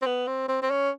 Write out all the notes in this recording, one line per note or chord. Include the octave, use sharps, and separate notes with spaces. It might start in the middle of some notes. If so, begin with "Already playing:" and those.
C4
B3
C4
C4
C4
C#4